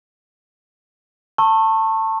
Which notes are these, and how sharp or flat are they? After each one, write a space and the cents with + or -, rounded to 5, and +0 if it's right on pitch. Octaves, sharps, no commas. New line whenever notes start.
A5 +20 C#6 -30 E6 +0